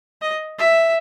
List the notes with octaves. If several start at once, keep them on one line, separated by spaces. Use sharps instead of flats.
D#5
E5